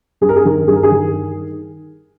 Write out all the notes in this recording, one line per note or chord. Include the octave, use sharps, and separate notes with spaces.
G2 G#4
A#4
G#4
D#3
G2 G#4
A#4
G#4
D#3